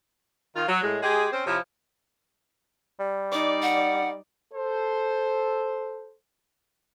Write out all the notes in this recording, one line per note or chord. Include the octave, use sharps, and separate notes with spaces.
D#3 F4
F#3
A2 G#3
G#3 G4 G#4
C4 C#4 C5
C3 F3 E4 C#5 F5
G3
D#4 D5 D6
F#5
A4 C5